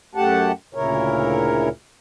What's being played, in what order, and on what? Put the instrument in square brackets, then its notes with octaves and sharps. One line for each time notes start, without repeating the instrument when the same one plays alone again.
[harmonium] F#2 A3 G4 F#5 A5
D2 A#2 C#3 E4 A#4 C#5